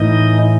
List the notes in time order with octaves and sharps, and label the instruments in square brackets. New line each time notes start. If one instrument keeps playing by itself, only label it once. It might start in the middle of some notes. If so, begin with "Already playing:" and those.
Already playing: [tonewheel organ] A2 E3 D#4 D#5